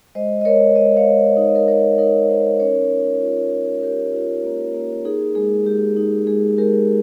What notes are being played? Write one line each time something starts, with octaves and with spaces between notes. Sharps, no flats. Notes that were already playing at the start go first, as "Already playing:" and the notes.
G#3 C5 D#5
D#5
G#3 A#4 C#5
G#3 C5 D#5
C#5 F5
G#3
D#4 C#5
D#5
A#4 C#5
D#4 A#4 C#5
D#4 A#4 C#5
D#4 C5 D#5
C#4 A#4 C#5
F4
F4
F4
F4 G4 A#4
F4
A#3
A#3
D#4 G#4
G#3 G#4
G#3 G4
D#4
G#3 G#4
G#3 G4 A#4